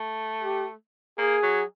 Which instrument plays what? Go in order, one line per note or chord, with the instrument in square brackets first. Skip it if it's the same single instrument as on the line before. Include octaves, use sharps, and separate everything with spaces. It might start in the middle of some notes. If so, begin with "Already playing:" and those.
Already playing: [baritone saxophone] A3
[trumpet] G4
[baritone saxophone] A#3 [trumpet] G#4
[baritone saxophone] F#3